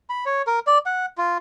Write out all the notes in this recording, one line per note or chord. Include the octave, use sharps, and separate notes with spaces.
B5
C#5
A#4
D5
F#5
F4